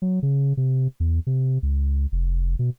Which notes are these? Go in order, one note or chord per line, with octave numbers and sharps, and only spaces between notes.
F#3
C#3
C3
E2
C3
C#2
F1
B2